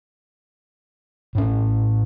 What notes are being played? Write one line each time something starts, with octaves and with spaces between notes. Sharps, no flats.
A2 C#4